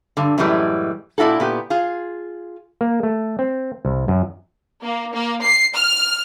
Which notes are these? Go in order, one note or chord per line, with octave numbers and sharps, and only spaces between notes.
G2 D3
F#2 A2 E3 G3 G#3
A#2 D4 E4 F#4 A4
A#2 B3 G4
F4 G#4
A#3
A3
C4
C2
F#2
A#3
A#3
C7
F6